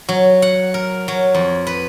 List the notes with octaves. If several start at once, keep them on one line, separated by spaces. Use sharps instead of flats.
F#3
F#5
A#4
F#3
F2
B4